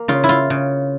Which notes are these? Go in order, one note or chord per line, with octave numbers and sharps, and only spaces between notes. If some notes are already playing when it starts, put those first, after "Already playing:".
Already playing: A#3
C#3 F4
E4
F4
C#3